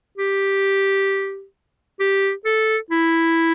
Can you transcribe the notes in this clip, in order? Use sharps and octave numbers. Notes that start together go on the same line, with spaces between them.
G4
G4
A4
E4